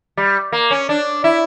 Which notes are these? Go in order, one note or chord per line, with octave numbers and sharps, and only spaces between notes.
G3
A#3
C#4
D4
E4